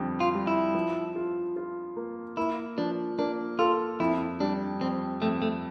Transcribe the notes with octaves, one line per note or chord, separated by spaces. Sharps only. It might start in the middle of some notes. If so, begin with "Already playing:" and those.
Already playing: F2 D3 G3
F4
G3
E4
F3
F4
F4
A#3
A#3 E4
F3 D4
A#3 D4
F4 A4
F2 E4
G3 D4
F2 C4
F2 A3
A3